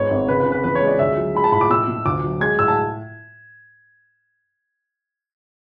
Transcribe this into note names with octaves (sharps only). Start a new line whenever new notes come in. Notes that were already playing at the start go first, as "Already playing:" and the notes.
Already playing: G#2 B3 C#5
G#1
C#3 B4
B4
C#3
B4
E2 B4
C#5
G#3
D5
D2 E5
F#3
G#3 B5
A5
A2 B5
D6
B2 E6
B2
D2 D6
F#3
G#3 G#6
A2 E6
A5